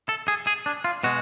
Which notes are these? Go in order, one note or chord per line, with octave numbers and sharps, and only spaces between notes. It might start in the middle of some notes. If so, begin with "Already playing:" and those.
A4
G#4
G#4
D4
F4
B2 G#3 F#4